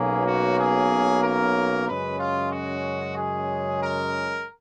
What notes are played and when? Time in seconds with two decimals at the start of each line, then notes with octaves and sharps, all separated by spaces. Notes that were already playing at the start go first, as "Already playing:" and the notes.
Already playing: B1 B2 A#3 C#4 G#4
0.25 F#4
0.58 G#4
1.23 A#4
1.86 F#2 C#3 G#3 C#4 B4
2.19 F4
2.51 F#4
3.16 G#4
3.80 A#4